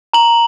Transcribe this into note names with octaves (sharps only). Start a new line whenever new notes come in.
A#5 F#7